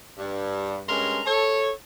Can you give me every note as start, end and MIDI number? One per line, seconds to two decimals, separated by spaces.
0.18 0.80 43
0.88 1.21 43
0.88 1.21 56
0.88 1.21 61
0.88 1.21 70
0.88 1.21 82
0.88 1.21 84
1.26 1.71 69
1.26 1.71 73